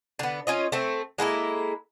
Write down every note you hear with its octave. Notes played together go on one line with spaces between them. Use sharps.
D3 B3
C#4 F4 D#5
A3 C4
G#3 A#3 E4 A4